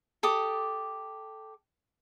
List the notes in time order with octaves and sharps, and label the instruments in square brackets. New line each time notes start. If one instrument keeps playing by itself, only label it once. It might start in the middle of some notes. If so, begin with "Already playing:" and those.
[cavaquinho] G4 A4 D6 D#6